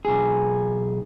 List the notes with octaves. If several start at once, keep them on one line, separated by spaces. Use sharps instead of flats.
B1 G#4